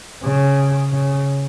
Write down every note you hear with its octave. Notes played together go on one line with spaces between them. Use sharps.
C#3
C#3